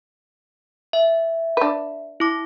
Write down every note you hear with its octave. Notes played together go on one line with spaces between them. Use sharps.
E5
D4 B4
E4 D6